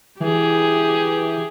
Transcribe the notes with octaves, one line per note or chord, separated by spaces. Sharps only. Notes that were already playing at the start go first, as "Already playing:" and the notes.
E3 G4 G#4